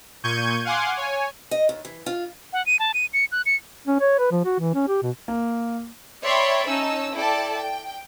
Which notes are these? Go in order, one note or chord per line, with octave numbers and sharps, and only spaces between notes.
A#2 C#6 G6 G#6 D#7
F5 F#5 G#5 C6 D6
C#5 G#5
D#5
D#2
E3
F4
F#5
D#7
A5
D#7
C#7
F#6
C#7
C#4
C#5
B4
F3
F#4
E3
C#4
G4
B2
A#3
C#5 D5 E5 G5 B5 C6
C#4 D#4 A5 E6
E4 A4 D5 G5 A5
G5